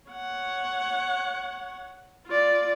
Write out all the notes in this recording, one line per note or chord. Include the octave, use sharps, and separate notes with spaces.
C#5 F#5
F4 D5